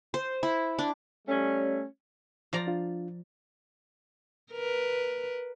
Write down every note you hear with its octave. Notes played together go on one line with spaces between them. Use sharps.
C5
E4
D4
G3 A3 C#4
F3 D5 A#5
D4 F4
A#4 B4